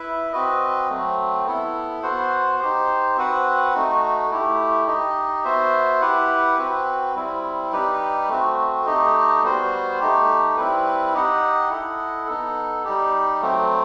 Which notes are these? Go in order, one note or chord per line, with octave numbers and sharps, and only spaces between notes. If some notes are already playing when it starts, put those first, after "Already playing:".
Already playing: E4 B4 E5
C4 F#4 B4 D#5
F#3 A3 C4
B3 E4 A4
B3 F#4 C5 F#5
D#4 G4 C5
C4 F#4 B4 F#5
A3 D#4 F#4
A3 E4 G4
D#4 G4 D#5
B3 F#4 C5 E5
E4 G4 B4 F#5
C4 F#4 B4
G3 C4 E4
G3 D#4 G4 B4
A3 C4 F#4
A3 D#4 G4 D#5
G3 B3 F#4 C5
A3 D#4 G4
G3 C4 E4 B4
D#4 G4 D#5 F#5
E4 A4 D#5 F#5
B3 D#4 A4
G3 D#4 G4
F#3 A3 C4